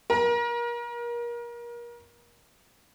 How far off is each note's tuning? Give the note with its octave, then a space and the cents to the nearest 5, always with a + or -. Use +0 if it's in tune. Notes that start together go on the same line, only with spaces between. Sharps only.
A#4 +30